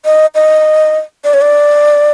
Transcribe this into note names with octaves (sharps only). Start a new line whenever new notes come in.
D#5
D#5
D5
C#5
D5